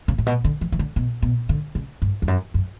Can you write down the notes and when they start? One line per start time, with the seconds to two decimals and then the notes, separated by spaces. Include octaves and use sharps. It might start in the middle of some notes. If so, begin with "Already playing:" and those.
0.08 C#3
0.18 A2
0.26 B2
0.44 D3
0.61 E3
0.72 E3
0.79 D3
0.96 B2
1.22 B2
1.49 D3
1.75 C#3
2.02 G2
2.22 E2
2.28 F#2
2.54 F#2